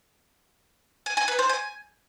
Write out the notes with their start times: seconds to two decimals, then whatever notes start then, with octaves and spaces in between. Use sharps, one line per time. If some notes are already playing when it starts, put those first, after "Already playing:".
1.06 G#5
1.17 G#5
1.28 B4
1.39 C5
1.49 G#5